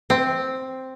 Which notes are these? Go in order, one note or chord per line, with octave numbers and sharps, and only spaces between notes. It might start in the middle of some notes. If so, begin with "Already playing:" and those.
C4